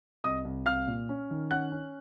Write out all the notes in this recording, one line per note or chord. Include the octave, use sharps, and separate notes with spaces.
C2 D#5 D#6
C2
C2 F5 F6
A#2
C#4
D#3
C#4 F#5 F#6
C#4